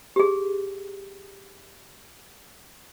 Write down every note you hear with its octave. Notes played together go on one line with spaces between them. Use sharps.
G4 G#4